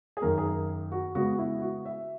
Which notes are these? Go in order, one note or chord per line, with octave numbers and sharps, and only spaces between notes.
G#4
F#2 D#3 A#3 A#4
G#4
A#4
F#4
C#3 G#3 B3 F#4
E4
F#4
E5